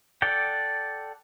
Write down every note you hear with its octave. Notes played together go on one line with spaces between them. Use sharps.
A4 D5 F#5 G5